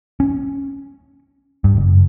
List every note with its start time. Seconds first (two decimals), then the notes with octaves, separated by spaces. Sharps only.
0.20 C#4
1.64 G2
1.77 F#1